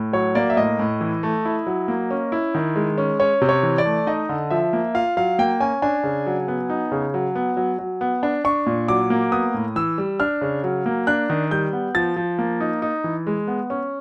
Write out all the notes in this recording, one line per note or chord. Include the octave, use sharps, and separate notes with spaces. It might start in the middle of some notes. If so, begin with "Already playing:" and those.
Already playing: A2
F#3 C#5
A#3 D5
E5
A2 D#5
A2
E3
A3
E4
F#3
A#3
C#4
E4
D#3
G#3
C#4
C#4 C#5
C3
C#5
E3
D5
A3
D#4 D#5
D3
F3 E5
A#3
F4 F5
F#3 F5
A#3 G5
C#4 G#5
D4 G#5
C#3
F#3
B3
D#4
C#3
F#3
B3
F#3
F#3
B3
D4
D4 C#6
A#2
F#3 D6
A#3
B3 D#6
A2
E3 E6
G3
D4 F6
C#3
F#3
A#3
D4 F#6
D#3
G3 G6
B3
F3 A6
F3
A#3
D#4
D#4
E3
G#3
B3
C#4